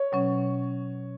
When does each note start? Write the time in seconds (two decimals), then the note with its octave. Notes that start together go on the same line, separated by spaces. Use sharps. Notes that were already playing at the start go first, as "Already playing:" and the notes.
Already playing: C#5
0.12 B2 F#3 C#4